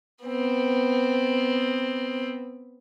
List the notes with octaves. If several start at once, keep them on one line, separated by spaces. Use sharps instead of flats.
B3 C4